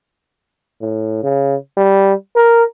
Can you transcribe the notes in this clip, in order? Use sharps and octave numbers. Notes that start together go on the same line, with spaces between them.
A2
C#3
G3
A#4